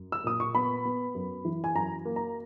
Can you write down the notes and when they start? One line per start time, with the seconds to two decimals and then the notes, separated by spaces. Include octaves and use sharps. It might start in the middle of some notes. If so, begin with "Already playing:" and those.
Already playing: F#2
0.12 E6
0.24 A#2 D#6
0.40 C#6
0.55 B3 B5
0.85 B3
1.15 F#2
1.45 E3
1.64 G#5
1.75 F#2 A#5
2.05 A#3
2.16 A#5